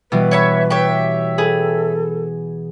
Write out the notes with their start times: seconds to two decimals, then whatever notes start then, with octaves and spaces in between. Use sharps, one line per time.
0.12 B2 E3 G3 B4
0.31 C#5 E5 B5
0.70 G4 C#5 E5
1.38 G#4 A4 B4